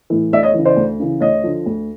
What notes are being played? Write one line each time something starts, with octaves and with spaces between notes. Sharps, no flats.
A2 E3
D2 D5 E5
C#5 D#5
C#3 E3
C5 D5
D2
C#3 E3
D2 C#5 D#5
D3 F3
D2